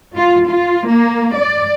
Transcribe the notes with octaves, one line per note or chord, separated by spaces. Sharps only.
F4
F4
A#3
D5